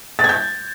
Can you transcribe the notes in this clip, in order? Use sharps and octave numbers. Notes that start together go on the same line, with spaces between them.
A6
G#6
G6